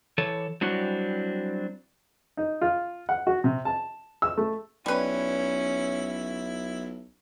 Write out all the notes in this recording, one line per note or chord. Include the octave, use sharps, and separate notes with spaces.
E3 A4 C#5
F#3 G3 C4 D4 E4 F#4
D#4
F4
F#5
F#4
C3
A5
E6
A3
B1 G3 C#4 E4 B4